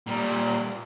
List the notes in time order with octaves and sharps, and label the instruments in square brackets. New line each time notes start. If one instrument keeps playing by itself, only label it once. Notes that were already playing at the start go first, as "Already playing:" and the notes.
[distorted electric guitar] A#2 G3